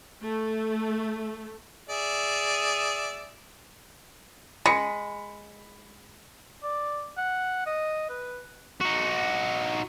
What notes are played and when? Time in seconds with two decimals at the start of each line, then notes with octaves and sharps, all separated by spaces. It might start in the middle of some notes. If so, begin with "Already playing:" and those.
0.23 A3
1.89 G#4 D5 E5
4.66 G#3 B5 C#7
6.63 D5
7.17 F#5
7.66 D#5
8.09 B4
8.80 D#4 F#4